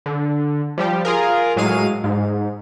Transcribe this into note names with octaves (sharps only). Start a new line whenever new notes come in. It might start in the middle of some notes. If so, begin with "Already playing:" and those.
D3
F3 G3 G4
F4 G#4 A#4
A2 F#3 G#3 F5 D#7
G#2